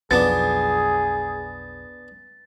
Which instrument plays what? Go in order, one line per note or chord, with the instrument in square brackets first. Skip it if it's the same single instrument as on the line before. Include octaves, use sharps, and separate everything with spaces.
[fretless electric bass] B1 F2 [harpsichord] B3 D4 [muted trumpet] G#4 [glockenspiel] A6